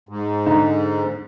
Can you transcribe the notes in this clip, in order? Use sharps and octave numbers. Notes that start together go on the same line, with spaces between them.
G#2
D3 D#4